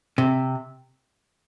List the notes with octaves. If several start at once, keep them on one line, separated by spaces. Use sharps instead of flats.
C3